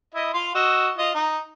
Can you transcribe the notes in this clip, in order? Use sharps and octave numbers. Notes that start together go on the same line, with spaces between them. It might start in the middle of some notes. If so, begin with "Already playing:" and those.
E4 D#5
F4 F5 C6
F#4 D#5 E6
F4 D#5
D#4